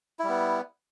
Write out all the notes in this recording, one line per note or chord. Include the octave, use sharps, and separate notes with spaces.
G3 B3 E4